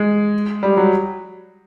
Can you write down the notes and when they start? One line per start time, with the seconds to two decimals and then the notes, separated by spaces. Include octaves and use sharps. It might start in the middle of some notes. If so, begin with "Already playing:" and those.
Already playing: G#3
0.63 G3
0.77 F#3